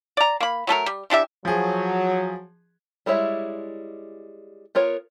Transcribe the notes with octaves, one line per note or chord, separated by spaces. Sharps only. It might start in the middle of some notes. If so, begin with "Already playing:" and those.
D5 A#5
A#3 B5
F#3 A3 A4 A#4
G3
E3 D4 G4 E5
F3 F#3 G#4
G3 G#3 E4 C#5 E5
B3 F4 A#4 C#5